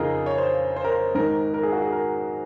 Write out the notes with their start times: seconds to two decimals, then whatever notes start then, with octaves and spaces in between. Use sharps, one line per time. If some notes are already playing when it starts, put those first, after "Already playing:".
Already playing: F2 C#3 D#4 F4 G#4 A#4
0.26 C#5
0.38 C5
0.76 C5
0.85 A#4
0.92 C5
1.15 G#2 D#3 A#4
1.54 A#4
1.63 G#4
1.72 F#4
1.82 G#4
1.92 A#4